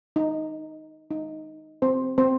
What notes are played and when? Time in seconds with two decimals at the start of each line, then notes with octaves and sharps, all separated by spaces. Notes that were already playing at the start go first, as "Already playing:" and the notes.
0.16 D#4
1.11 D#4
1.82 C4 C5
2.18 C4 C5